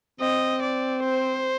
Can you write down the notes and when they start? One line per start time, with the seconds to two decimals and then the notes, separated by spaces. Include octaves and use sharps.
0.20 C4 D#5
0.62 D5
1.05 C5